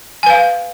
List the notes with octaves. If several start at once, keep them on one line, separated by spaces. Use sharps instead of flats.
B4 F5 G#5